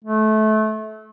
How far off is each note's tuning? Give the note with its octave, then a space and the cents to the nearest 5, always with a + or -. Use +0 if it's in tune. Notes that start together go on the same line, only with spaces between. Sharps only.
A3 -25